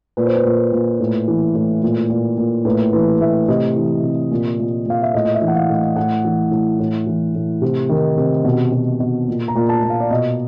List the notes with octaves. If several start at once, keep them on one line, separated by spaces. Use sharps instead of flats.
A#2 B4
C5
B4
A#2
A#2
A2
E3
A2
A#2
A#2
A#2
A2 B4
E3 B4
A2 E5
C3 D#5
E3
C3
A#2
A#2
A#2 F5
E5
A2 D#5
D#5
E5
E3
F#5
F5
A2
A2 F#5
E3
A2
A2
E3
A2
C3
D#3
C3
B2
B2
B2
A#2
A#5
A#2
A5
A#2
F5
D5
B2 D#5